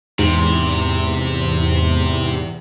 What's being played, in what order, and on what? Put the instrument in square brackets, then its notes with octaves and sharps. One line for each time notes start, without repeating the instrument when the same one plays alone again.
[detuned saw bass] E2 [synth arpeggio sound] G#2 [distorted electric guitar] C3